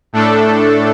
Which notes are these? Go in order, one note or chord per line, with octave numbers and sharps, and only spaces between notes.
A2 A3 D4 A4